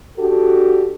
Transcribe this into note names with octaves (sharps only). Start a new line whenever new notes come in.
D4 F#4 G4 A4